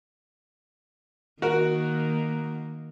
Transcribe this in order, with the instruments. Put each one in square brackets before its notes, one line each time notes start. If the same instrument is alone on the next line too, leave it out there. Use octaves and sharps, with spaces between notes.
[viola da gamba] D#3 A#3 [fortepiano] F#4 A#4